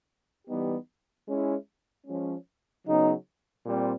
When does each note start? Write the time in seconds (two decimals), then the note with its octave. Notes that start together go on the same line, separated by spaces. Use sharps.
0.48 E3 G3 B3 D#4 G4
1.27 G#3 C#4 E4
2.07 F3 G#3 C#4
2.86 C#3 F#3 B3 D#4 G#4
3.65 A#2 G3 C4